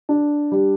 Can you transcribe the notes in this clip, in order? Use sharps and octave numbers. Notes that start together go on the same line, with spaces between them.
D4
G3